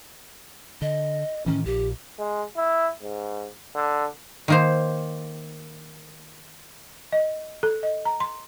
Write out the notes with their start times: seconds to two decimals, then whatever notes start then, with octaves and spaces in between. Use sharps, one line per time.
0.82 D3 D#5
1.46 A2 D#3 E3 C#4
1.66 A#1 A#2 G4
2.18 G#3
2.57 E4
3.02 G#2
3.75 D3
4.48 D#3 A#3 C5
7.12 D#5
7.63 A4
7.83 D#5
8.05 A#5
8.20 C6